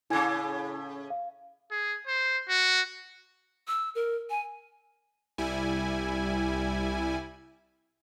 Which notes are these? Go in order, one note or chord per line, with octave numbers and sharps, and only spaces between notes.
A2 C#3 E4 G#5 G#6
F5
G#4
C5
F#4
E6
A#4
G#5
C2 G3 E4 G#5